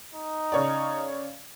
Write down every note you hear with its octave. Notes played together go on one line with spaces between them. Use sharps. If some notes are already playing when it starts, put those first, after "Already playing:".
D#4
C#3 C#5 D5